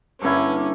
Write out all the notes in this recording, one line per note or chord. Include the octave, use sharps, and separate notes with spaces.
G2 D3 A#3 C#4 E4